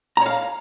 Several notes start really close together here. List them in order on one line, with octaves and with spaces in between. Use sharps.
A#5 C#5 F5